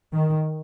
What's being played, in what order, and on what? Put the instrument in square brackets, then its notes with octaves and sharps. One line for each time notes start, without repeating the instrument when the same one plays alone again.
[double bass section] D#3